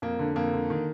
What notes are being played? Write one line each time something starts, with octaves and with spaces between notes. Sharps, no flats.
F2 A#3
D3
F2 A#3
D3
D#3